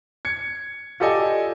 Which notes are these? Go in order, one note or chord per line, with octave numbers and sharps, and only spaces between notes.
G#6 C#7
F4 G4 A4 D5 D#5 G#5